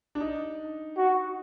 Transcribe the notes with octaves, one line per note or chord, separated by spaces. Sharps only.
D4
D#4
F#4